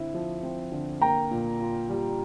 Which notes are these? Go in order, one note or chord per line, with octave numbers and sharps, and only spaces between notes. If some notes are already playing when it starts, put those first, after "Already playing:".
Already playing: D3 C4 E4
F3
C4
D3
A#3 G5 A#5
A#2
F4
G3